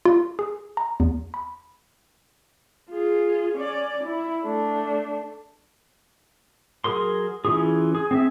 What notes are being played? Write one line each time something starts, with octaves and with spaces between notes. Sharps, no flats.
F4
G#4
A#5
E2
B5
F4 G#4
C#4 D5
E4
A3 D4
F#3 G#4 A#4 C6
E3 C#4 F4 G#4
G#4
C4 G#4 E5